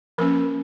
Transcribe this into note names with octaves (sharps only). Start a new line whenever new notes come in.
F3 A#3 C#4 A#4